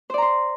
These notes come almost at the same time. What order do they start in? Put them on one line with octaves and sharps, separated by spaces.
C5 D5 A#5 C6